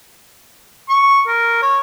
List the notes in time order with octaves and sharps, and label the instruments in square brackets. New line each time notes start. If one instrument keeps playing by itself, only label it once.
[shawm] C#6
A#4
C#5